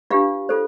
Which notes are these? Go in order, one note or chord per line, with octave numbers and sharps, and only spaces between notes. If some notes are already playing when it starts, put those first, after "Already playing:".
D4 F4 G4 B4 F5
F4 A4 C5